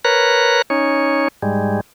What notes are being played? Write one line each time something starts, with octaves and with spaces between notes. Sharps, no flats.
A#4 B4 C#5 A#5 F#6
C#4 D#4 C#5
G#2 G3 G#3